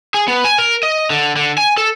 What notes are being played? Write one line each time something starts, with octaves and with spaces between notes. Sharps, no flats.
G#4
B3
G#5
A#4
D#5
D3
D3
G#5
A4